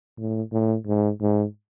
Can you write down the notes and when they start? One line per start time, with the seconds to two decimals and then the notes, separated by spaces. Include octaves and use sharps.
0.18 A2
0.52 A2
0.86 G#2
1.20 G#2